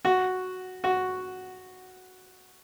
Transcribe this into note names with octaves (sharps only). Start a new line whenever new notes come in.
F#4
F#4